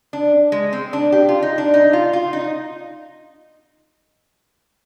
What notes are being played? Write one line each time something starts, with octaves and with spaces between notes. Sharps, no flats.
D4
G#3
C4
D4
G4
F4
D#4
D4
D#4
F4
F4
D#4